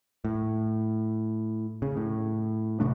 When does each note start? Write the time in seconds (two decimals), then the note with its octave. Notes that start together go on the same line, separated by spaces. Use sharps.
0.25 A2
1.82 C#3
1.97 A2
2.80 A1 C3 A3 D4